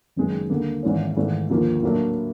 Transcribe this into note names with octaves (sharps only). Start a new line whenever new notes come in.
F#1 F#2 D#3 G#3 B3
D#2 D3 G3 A#3
G#1 G#2 E3 G#3 C#4
G#1 G#2 E3 A3
D#2 D3 F3 A#3
A2 F#3 A#3 D4